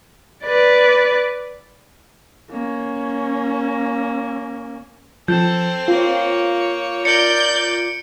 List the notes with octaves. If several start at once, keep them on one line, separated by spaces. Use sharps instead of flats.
B4 D5
A#3 C#4
F3 C4 A4 G6
A#3 F4 C#5
A#4 D5 G6 C#7 D7